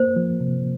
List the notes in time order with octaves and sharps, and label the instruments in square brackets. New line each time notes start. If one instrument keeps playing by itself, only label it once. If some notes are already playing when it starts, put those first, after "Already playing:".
Already playing: [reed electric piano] A#3 [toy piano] C5
[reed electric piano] F3
C3